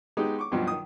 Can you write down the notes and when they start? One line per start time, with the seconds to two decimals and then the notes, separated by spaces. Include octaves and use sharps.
0.17 G#3 B3 D#4 G4 G#4
0.39 C#6 D6
0.51 C#2 G2 B2 F3 F#3
0.67 D#3 D#6